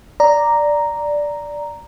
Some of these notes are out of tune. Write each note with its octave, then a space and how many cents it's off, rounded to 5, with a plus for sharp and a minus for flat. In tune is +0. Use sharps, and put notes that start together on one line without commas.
D5 +0 A#5 +0